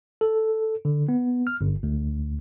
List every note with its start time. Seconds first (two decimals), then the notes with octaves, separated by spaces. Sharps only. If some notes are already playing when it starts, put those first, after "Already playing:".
0.21 A4
0.85 D3
1.09 B3
1.47 F6
1.61 G1
1.83 D2